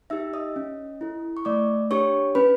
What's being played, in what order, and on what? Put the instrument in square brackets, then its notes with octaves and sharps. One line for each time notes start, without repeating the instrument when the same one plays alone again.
[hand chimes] D#4 G4 E5 E6
D#5 D#6
C#4
E4 A4
C#6
A3 D5 D6
D4 G4 C#5 C#6
C#4 B4 B5